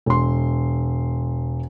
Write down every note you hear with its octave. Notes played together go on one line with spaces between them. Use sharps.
E1 C6